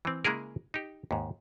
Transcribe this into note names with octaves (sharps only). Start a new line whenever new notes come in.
E3 C4
C#3 G#3 A#3 E4 G#4 A#4
D#4 G4
D#2 G#2